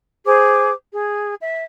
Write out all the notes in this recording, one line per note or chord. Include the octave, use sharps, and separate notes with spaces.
G#4 C5 D6
G#4
E5